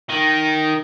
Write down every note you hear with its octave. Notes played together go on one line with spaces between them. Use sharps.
D#3